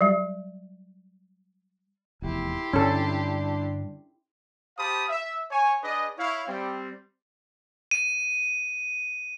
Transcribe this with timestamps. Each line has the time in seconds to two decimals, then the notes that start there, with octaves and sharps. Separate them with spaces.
0.01 F#3 G3
2.22 F1 E2 E4 G4 C6
2.73 G2 D3 G3 C#4 D4 A4
4.77 G4 C5 F5 A5 B5 D#6
5.09 E5
5.51 C#5 G#5
5.82 D4 G#4 B4 D5 D#5
6.17 E4 C#5 F5
6.47 G3 C4
7.91 D#7